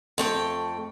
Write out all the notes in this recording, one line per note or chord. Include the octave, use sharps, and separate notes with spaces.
F2 A3 G5